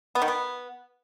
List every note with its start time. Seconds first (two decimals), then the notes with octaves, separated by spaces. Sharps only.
0.15 B3
0.22 D#3
0.28 B3